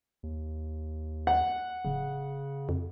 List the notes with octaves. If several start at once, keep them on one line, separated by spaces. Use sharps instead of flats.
D#2
F#5
D1 C#3
F2